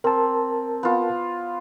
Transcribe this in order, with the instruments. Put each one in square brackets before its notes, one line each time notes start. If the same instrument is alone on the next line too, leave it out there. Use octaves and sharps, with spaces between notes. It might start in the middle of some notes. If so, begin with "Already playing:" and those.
[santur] C4 [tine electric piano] A#4 A5
[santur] B3 F4